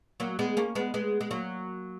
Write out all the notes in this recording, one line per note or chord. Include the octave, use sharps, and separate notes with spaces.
F#3 A#3
G#3 B3
A#3 C#4
G#3 B3
G#3 B3
G#3
F#3 A#3